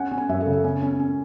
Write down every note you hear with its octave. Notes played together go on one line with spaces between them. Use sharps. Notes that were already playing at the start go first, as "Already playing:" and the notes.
Already playing: C#4 F#5
C#4
G#5
F#2 E5
A4
C#3
A4
C#4
C#4
C#4